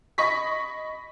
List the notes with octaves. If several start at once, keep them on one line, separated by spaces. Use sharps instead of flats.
D#5 B5 C#6 A#6 B6